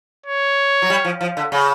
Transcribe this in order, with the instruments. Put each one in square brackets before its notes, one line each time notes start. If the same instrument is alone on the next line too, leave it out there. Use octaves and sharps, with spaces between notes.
[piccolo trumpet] C#5
[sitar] F#3
G3
F3
F3
D3
C#3